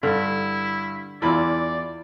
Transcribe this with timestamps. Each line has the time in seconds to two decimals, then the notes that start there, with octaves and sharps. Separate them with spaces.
0.03 G2 D3 E4
1.22 E2 E4 F4 D5 B5